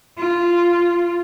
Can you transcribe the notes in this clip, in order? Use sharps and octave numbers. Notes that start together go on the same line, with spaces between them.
F4